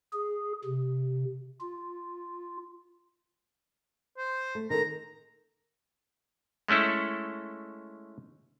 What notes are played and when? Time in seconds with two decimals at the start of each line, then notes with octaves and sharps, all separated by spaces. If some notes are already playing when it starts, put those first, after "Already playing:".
0.13 G#4
0.64 C3
1.60 F4
4.18 C5
4.55 A3
4.70 D#3 A4 A#5
6.68 G#3 A3 C#4 E4 A4